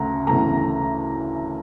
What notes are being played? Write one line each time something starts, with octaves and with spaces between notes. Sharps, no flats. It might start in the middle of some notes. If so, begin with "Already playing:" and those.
Already playing: D2 C#3 A3 A#5
D2 C#3 E3 A3 A#5